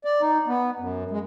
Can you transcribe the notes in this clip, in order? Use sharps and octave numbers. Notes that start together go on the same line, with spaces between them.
D5
D#4
B3
F#2
G#3